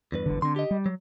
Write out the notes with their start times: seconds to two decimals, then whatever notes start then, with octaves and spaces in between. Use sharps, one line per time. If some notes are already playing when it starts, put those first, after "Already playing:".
0.12 E2 G2 B4
0.26 G1 D3
0.42 D3 C4 C6
0.56 G4 D#5
0.71 G3
0.86 F#3